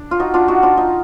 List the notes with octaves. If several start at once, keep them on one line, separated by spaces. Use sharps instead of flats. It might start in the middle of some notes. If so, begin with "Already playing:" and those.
Already playing: D4
F4
D#4 F#4
D4 F4
D#4 F#4
D4 F4
D#4